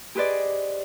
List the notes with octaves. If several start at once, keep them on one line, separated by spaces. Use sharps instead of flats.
G4 G#4 B4 C5 D5 D#5